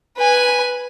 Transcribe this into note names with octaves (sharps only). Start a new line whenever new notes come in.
B4 G#5